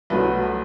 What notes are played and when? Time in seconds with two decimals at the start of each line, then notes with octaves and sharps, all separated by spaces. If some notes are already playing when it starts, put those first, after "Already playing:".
0.10 C2 B2 F#3 A3 B4